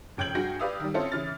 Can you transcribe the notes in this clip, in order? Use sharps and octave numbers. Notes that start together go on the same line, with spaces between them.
F1 C#3 G5 G6 G#6 F#7
G2 F#4 G#4 G5 A#6
G4 B4 D5 F5 D#6 E6
D#3 G3
C4 C#4 E4 F4 A4
C#3 E3 F6 A6